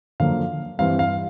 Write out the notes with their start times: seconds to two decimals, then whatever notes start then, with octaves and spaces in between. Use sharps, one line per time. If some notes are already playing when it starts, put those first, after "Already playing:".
0.20 F#2 D3 F3 A#3 F5
0.79 G2 E3 G3 C4 F5
0.99 F5